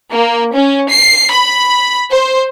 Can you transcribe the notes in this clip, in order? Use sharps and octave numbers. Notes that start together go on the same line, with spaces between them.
A#3
C#4
C7
B5
C5